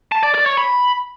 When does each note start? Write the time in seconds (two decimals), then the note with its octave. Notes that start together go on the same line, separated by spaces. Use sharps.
0.12 A5
0.23 D5
0.35 D5
0.46 C#5
0.57 B5